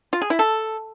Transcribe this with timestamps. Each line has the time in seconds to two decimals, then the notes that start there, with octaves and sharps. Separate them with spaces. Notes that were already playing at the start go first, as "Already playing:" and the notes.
0.13 F4
0.21 G#4
0.30 E4
0.39 A4